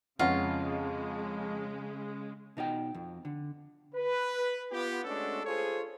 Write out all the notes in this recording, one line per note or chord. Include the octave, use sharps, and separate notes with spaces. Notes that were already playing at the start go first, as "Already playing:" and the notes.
F2 C#3 G#3 C#4 F4 B4 D#5 F#5
B2 D#4 D5 G5
F2
D3
B4
B3 F4 G4
G#3 A3 C#4 D4 F#4 A4
F4 G#4 A4 C5 C#5